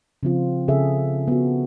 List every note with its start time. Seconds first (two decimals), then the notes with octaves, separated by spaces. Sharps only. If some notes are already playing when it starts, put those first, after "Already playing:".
0.23 C#3 F3 C4 F4
0.68 C#3 G#4 A4 E5
1.28 B3 F#4